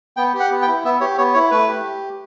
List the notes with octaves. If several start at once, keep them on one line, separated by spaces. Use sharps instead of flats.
B3 G5
G4
F#5
B3
G5
E4
B3 E5
G4 C#5
B3 C#5
E4 C#5
A3 B4
G4